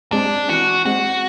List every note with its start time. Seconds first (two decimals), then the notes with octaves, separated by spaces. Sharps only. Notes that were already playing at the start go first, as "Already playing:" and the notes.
0.12 G#3 C4 D4
0.48 E3 F#4
0.85 G#3 C4 F#4